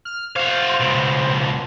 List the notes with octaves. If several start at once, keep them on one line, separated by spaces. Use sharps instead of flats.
F6
F#4 C5 F5
C#2 B2